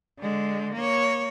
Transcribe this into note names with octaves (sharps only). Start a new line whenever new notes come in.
D3 G#3
A#3 C#5